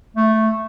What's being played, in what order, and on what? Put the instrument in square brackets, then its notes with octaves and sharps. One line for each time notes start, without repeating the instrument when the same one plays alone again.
[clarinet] A3